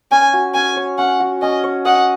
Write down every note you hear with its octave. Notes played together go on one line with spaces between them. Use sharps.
C#4 G#5
F#4
C#4 G#5
C#5
C#4 F#5
F#4
C#4 D#5
C#5
D#5 F#5